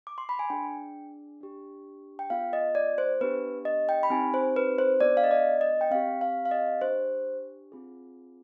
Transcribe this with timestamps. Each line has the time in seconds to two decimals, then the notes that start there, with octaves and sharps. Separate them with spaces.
0.07 D6
0.18 C6
0.29 B5
0.39 G#5
0.50 D4 G#4 G5
1.41 D4 G4
2.19 G5
2.30 B3 F4 G#4 F5
2.53 D#5
2.75 D5
2.98 C5
3.21 B3 D4 G4 B4
3.65 D#5
3.89 G5
4.03 B5
4.10 C4 D#4 G4 G#5
4.34 C5
4.56 B4
4.78 C5
5.00 B3 D4 G#4 D5
5.17 F5
5.24 D#5
5.31 D5
5.61 D#5
5.81 G5
5.91 C4 G4 F5
6.21 F5
6.45 F5
6.51 D#5
6.81 D4 G4 C5
7.72 C4 F4 G#4